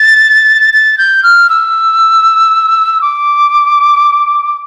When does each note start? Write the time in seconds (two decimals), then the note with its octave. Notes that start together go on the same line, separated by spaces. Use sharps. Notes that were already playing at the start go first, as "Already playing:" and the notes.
Already playing: A6
0.74 A6
0.98 G6
1.23 F6
1.50 E6
3.02 D6